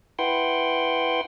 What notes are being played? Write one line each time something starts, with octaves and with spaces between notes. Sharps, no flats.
E4 B4 F#5 G5 C6